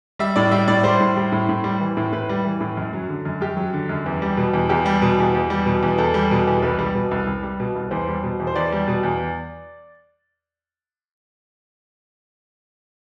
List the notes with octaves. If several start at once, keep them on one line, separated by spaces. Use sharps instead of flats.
G3 E5
A2 D5
G3 E5
A2 D5
G3 C5
A2
G3
A2
A2
G3
E3
A2
A2 B4
G3
E3
A2
F#2
F#3
D3
F#2
F#2 G4
F#3
D3
F#2
E2
G3
B2
E2
E2 G4
G3
B2
E2
E2
G3
B2
E2
E2 A4
G3
B2
E2
C2 B4
G3
B2
C2
C2
G3
B2
C2
E2 C5
G3
B2
E2
C5
E2 D5
G3
B2
E2